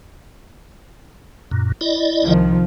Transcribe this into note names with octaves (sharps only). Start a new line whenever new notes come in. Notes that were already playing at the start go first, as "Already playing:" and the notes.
F#2 A#2
E4 D5 D#5
C2 D#3 F3